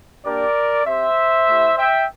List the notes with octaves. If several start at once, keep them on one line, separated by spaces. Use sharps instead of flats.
A#3 D4 G4 A#4 D5
C4 G4 C5 E5
A3 E4 G4
E5 G5